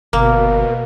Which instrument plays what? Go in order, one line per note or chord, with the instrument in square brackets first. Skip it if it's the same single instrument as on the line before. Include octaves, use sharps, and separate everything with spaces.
[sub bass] G1 [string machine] B2 [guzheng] A#3 [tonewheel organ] A#4